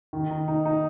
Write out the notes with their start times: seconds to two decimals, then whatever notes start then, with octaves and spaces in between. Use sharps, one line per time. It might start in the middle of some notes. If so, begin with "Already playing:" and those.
0.13 D#3
0.30 D#4
0.48 D#4
0.66 D#4